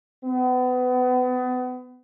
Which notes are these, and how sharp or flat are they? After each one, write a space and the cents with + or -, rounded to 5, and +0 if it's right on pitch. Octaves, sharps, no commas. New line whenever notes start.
B3 +30